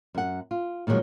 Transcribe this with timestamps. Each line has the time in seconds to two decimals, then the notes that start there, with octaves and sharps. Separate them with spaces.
0.15 F#2 F#5
0.51 F4
0.87 A#2 D#3 F3 F#3 G#3